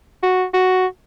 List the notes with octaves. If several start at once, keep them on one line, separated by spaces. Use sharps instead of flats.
F#4
F#4